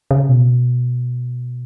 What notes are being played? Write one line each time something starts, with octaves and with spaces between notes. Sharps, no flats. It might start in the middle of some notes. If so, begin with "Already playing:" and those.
C#3
B2